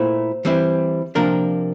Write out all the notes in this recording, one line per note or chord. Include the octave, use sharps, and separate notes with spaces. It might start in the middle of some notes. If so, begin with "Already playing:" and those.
Already playing: A#2 A3 E4 C5
E3 G3 C4 E4
C3 F3 A#3 D4 A#4